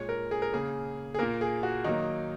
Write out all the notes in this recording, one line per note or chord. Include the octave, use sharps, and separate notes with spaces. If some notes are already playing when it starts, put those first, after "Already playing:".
Already playing: A#2 G#3 C#5
A#4
G#4
A#4
C#3 A#3 G#4
G#4
A#2 A#3 A#4
G#4
F#4
D#3 F#3 A#3 D#4